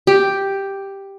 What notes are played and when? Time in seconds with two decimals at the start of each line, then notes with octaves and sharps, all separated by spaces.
0.07 G4